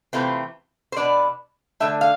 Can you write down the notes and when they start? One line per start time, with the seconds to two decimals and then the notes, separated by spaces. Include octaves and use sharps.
0.13 C3 E3 A3 C4 F4
0.92 C5
0.97 B2 B3 D4 D5
1.80 D3 A3 D4 E5
2.01 F5